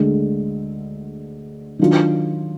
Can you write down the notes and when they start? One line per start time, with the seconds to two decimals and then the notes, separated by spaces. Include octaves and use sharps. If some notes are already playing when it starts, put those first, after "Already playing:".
Already playing: D2 D3 G#3
1.79 D#3 F#3 D4 F4